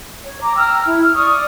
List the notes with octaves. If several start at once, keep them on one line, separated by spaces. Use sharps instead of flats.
C#5
A#5 D6
G5 A#5 E6 F6
E4
F6
D5 C#6 D#6 F6